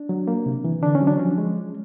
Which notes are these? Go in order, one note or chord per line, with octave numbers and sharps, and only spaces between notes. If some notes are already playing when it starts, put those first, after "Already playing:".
Already playing: D4
F#3
A#3
C3
E3
D3 D4
C#4
F#3
D4
F3 C#4
G#3